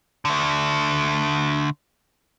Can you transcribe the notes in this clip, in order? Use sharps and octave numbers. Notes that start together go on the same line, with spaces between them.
D3 A3